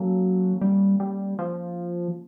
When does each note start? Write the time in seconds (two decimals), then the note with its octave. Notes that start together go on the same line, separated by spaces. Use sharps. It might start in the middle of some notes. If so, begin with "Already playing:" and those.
Already playing: F#3 A#3 C#4 A4
0.61 G3
1.00 G3
1.39 F3